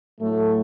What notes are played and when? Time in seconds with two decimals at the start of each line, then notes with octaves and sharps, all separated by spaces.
0.20 A2 F#3 A3